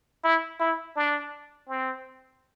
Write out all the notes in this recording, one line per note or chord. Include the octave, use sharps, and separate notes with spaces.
E4
E4
D4
C4